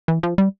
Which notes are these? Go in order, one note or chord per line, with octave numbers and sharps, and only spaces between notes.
E3
F3
G3